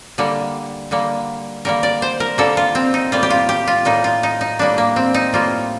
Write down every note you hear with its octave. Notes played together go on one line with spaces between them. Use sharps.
D3 G3 A#3
D3 G3 A#3
D3 G3 A#3 A#4
D5
C5
A#4
D3 G3 A#3 A4
F4
C4
D#4
A2 G3 A#3 F4
G4
F4
G4
F4
A2 G3 A#3 D#4
F4
D#4
D#4
A2 G3 A#3 D4
A#3
C4
D#4
A2 G3 A#3 F4